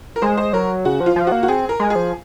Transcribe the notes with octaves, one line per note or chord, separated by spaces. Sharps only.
A#4
G#3 C5
C5
F#3 A#4
C#3 F#4
F3
F4
F3
A#3 F#4
F#4
C4 G#4
A#4
G#3
G#4
F3